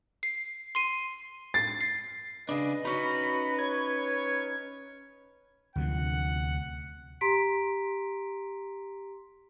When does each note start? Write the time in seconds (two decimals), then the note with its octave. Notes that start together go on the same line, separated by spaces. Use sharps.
0.23 C7
0.75 C6 C7 D#7
1.54 A6 C7
1.81 C7
2.49 C#3 D4 B4 D#5
2.85 C#4 D#4 F#4 B5
3.59 C#5 G#6
5.76 D2 C3 F3 F#5
7.21 G4 A#5 C6 B6 D7